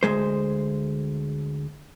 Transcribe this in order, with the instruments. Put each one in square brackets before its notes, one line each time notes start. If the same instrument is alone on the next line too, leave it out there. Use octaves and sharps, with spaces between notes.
[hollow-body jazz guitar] D2 G#3 C5